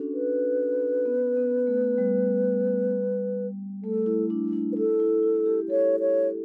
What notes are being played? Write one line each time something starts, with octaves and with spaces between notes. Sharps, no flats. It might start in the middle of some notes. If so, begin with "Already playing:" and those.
Already playing: C#4 D4 F#4 A4
B4
B3
B3
A3
G3
A3 A4
E4
D4
D4
B4
E4 A4
E4
E4
G4
A4 C#5
C#5